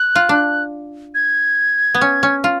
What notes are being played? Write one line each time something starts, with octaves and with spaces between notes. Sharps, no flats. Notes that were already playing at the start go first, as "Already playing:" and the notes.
Already playing: F#6
F4
D4
G#6
B3
C#4
C#4
F4